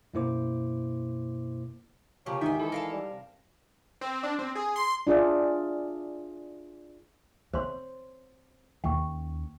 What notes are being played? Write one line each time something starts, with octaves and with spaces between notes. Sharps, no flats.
F#2 B2 A#3 E4 C5 D6
C#3 F3 A#3 G4 C#5
D2 G#2 D#3 E5 G#5 G6
E3 G#3 E4 A4
A#4 F5 A5
G3
C3
C4
D4
C4
G#4
C6
D4 F4 G#4 D5 E5
C4 C5 C#5 C6
D#2 C#4 G5 C#6